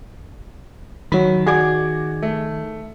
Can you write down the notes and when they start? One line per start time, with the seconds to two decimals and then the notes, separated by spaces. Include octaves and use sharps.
1.12 D#3 F#3 B5
1.46 F#4 G#4 D5 D6 G#6
2.23 A3